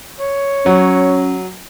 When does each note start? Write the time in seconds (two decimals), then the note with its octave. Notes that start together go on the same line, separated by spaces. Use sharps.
0.20 C#5
0.66 F#3 C#4